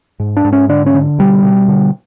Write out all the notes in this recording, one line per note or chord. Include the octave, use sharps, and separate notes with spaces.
G#2
D4
G#2
C#4
D3 D4
C#4
D3
B2 G3
B2
D3